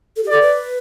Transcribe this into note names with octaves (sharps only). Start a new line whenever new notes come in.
A4
G4
A4 D5
B4